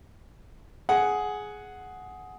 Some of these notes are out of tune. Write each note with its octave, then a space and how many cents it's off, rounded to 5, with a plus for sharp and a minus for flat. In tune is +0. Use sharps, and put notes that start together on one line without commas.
G#4 +10 F#5 +0